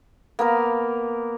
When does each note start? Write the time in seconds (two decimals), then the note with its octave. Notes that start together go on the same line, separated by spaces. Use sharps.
0.39 A#3 B3 A#4